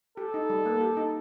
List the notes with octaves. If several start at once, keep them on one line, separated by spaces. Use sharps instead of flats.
G4 A4
D#4
G3
A#3
G4
D#4